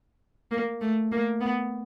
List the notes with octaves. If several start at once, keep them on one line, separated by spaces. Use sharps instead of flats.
A#3
A3
A#3
B3